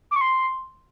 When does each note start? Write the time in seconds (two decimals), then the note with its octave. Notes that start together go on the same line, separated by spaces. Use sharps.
0.11 D6
0.16 C#6
0.21 C6